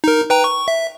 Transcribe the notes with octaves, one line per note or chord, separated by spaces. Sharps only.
D#4 A#4
B4 G5 A#5
C#6
E5